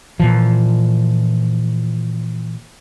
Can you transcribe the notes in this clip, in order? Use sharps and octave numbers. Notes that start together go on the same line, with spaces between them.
A#2 E3 F3